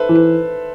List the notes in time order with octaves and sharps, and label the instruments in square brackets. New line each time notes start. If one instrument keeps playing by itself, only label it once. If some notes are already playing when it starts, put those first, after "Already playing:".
Already playing: [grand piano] A4 B4 C5 E5
[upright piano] E3
[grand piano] B4